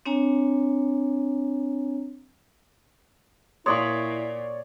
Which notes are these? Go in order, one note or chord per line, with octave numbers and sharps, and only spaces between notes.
C4 D4 C#5 G#5 A#5
A#2 E4 C#5 D5 C6 C#6 D#6